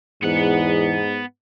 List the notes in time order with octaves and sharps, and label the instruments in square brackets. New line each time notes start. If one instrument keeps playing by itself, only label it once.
[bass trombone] E2 [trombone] G#2 [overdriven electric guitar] B3 F#5